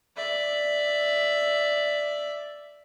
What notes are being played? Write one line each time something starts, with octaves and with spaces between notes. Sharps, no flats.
D5 E5